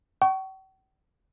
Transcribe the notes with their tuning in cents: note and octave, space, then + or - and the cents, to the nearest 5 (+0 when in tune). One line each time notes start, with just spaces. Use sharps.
G5 -45 C#6 +10